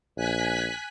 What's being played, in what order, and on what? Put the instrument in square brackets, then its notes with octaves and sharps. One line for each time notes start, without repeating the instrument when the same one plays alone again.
[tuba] A#1 [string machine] G#5 F#6 B6